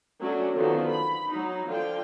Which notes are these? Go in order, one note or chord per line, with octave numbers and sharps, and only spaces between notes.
F#3 A3 C#4 D4
D3 D#3 F3 B3 F4 F#4
B5
F#3 D#4
D3 F3 F4 G5